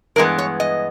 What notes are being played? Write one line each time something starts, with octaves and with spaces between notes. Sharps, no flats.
G2 E3 G#3 B3 A#4
C#5
D#5